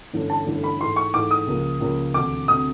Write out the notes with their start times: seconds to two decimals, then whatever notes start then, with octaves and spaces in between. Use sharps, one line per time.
0.13 G1 G2 E3 A3 C#4
0.30 A5
0.47 G1 G2 E3 A3 C#4
0.64 B5
0.80 G#2 E3 A3 C6
0.96 C#6
1.14 G#2 E3 A3 D6
1.31 D#6
1.47 C#2 C#3 F3 A#3
1.81 C#2 C#3 F3 A#3
2.14 E1 D2 C3 D6
2.48 D2 C3 D#6